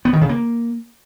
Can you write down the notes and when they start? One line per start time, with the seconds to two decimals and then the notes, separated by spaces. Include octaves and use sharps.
0.05 B3
0.13 D#3
0.21 C#3
0.29 A#3